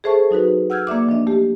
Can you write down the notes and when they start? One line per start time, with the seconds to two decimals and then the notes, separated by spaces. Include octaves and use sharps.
0.04 G#4 A4 C5 E5 A5 C#6
0.31 F#3 D#4 F#4 B4
0.70 F#5 E6 F6 G6 G#6
0.87 A#3 D5 E5 D6
1.09 F3 D4 D#5 E5
1.27 A3 G4